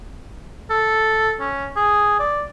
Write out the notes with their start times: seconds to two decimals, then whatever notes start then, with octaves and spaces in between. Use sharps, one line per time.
0.70 A4
1.40 C#4
1.76 G#4
2.20 D5